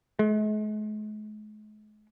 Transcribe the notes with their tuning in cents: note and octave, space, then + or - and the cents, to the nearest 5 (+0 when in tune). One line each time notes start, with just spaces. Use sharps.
G#3 +45